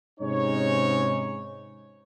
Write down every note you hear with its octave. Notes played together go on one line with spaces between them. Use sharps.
G#2 C3 G#3 C#4 D#4 C#5